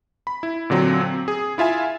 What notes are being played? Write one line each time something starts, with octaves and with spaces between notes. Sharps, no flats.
B5
E4
A#2 D3 F#3 C4
C4
G#4
E4 F4 E5 G#5